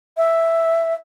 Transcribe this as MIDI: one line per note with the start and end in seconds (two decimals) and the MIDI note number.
0.17 0.94 76